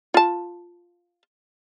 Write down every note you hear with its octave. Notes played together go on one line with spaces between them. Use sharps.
F4 A5